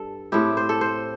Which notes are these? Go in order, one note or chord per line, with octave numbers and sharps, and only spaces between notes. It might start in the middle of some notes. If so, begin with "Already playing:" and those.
Already playing: G2 A4
A2 A3 C4 E4 G4
C5
A4
C5